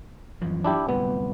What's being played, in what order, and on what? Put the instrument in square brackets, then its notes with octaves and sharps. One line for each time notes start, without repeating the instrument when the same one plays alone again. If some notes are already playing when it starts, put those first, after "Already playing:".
[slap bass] F#2 E3 F3
[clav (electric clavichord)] D4 E4 G4
[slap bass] D1 C2 F2 [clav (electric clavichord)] B3